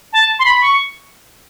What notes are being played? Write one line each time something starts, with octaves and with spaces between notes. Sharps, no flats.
A5
C6
B5
C#6